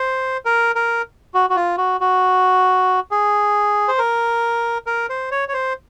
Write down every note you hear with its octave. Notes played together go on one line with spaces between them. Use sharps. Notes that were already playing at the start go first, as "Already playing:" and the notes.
Already playing: C5
A#4
A#4
F#4
F#4
F4
F#4
F#4
G#4
C5
A#4
A#4
C5
C#5
C#5
C5